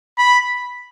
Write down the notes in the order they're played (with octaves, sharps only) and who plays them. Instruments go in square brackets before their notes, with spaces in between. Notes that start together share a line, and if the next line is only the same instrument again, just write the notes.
[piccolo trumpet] B5